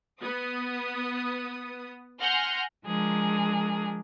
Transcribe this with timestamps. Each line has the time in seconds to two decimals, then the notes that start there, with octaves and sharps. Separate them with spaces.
0.21 B3 D#6
2.19 F#5 G#5 C6 F6 G6 A#6
2.85 F3 G#3 D4 G#4 A#4